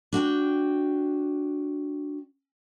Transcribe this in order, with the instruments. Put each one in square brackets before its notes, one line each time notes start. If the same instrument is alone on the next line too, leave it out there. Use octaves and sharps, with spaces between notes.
[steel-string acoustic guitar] D4 F#4 G5